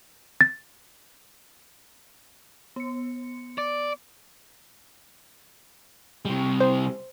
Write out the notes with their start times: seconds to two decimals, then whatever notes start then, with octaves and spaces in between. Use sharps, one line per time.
0.41 A6
2.76 B3 C#7
3.58 D5
6.25 C3 G3
6.60 C5